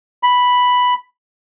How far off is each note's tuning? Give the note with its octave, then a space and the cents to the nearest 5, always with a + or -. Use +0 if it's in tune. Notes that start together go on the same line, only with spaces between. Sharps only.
B5 +0